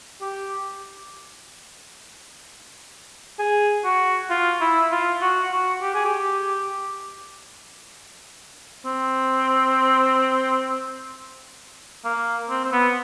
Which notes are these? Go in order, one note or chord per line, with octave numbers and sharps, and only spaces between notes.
G4
G#4
F#4
F4
E4
F4
F#4
F#4
G4
G#4
G4
C4
A#3
C4
C4
B3